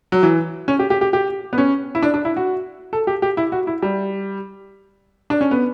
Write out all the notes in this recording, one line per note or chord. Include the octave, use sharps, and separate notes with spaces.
F#3
E3
C#4
G4
G4
G4
G4
B3
C#4
E4
D4
D4
E4
F#4
A4
G4
G4
E4
F#4
E4
G3
D4
C#4
B3